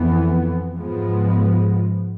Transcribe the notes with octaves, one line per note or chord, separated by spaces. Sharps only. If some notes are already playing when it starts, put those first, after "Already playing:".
Already playing: F2 E3 B3
G#2 F3 G#3 B3